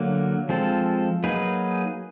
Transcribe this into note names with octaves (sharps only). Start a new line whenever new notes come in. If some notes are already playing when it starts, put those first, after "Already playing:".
Already playing: D3 F#3 A#3
F3 G#3 C4 F4 A4
F#3 A#3 D#4 G#4 B4